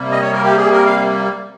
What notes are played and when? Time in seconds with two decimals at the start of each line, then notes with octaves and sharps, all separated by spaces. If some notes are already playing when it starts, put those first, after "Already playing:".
Already playing: C3 G3 A#3
0.11 D#5
0.21 C#5
0.32 A#4
0.43 G4
0.57 G#4
0.72 A#4
0.86 F5